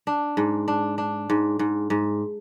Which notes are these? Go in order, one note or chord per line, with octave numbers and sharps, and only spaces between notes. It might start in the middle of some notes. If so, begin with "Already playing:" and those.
D4
G#2
D4
D4
G#2
G#2
G#2